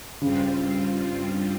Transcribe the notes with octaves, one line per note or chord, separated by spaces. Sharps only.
G2 C#3 G3 C4 F4